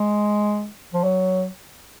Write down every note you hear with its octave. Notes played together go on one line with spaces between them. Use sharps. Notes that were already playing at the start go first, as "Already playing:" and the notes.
Already playing: G#3
F3
F#3